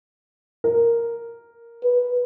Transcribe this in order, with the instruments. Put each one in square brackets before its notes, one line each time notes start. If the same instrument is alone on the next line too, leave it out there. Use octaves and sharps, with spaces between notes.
[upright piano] A#4
[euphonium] B4